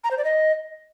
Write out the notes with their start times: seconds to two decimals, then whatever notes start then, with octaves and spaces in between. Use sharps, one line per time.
0.04 A#5
0.11 C5
0.18 D5
0.25 D#5